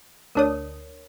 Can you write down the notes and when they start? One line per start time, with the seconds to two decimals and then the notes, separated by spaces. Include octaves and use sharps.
0.35 D2 D4 A#4 C#5 D#6